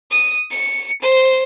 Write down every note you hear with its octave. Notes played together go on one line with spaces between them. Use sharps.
D#6
C#7
C5